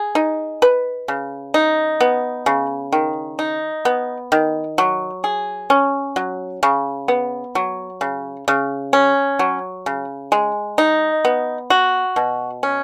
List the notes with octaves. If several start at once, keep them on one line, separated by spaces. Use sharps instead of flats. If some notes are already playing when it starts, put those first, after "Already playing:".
Already playing: G#4
D#4
B4
C#3
D#4
B3
C#3
D#3
D#4
B3
D#3
F#3
G#4
C#4
F#3
C#3
B3
F#3
C#3
C#3
C#4
F#3
C#3
G#3
D#4
B3
F#4
B2
C#4